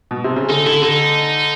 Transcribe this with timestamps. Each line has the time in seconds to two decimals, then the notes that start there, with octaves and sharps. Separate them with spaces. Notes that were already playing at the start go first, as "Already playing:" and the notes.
0.11 B2
0.24 C3
0.36 C#3
0.49 D3 D#4
0.66 D3 E4
0.82 D3 D#4